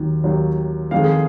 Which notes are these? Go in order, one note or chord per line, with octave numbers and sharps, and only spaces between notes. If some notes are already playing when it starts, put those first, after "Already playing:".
Already playing: D#2 D#3 F#3
D#2 D#3 F#3
F2 D#3 G#3 F5
G#4